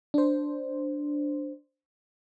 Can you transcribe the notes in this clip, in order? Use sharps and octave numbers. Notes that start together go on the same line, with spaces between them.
D4 C5